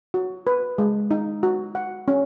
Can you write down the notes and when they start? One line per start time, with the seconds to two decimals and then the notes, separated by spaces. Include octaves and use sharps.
0.14 F#4
0.47 B4
0.78 G#3
1.11 D#4
1.43 F#4
1.75 F#5
2.08 C#4